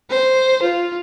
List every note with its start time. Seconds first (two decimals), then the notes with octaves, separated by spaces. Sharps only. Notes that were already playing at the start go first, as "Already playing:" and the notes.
0.10 C5
0.62 F4